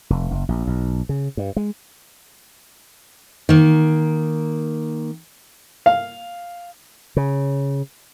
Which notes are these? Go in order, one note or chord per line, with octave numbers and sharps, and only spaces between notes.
F1
F#1
A#1
B1
C#3
G2
G#3
D#3 A#3
F5
C#3